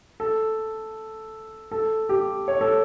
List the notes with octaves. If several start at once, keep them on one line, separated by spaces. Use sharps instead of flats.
A4
A4
G4
C#5
A4